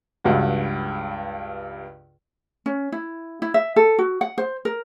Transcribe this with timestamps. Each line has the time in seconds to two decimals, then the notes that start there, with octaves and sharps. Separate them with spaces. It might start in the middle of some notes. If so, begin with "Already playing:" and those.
0.24 C#2 G2 F#4
2.66 C#4
2.92 E4
3.42 E4
3.54 E5
3.76 A4
3.99 F#4
4.21 F#5
4.38 C5
4.65 A#4